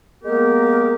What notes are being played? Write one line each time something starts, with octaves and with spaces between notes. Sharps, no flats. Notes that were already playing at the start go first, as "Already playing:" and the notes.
G#3 A#3 B3 G4 A#4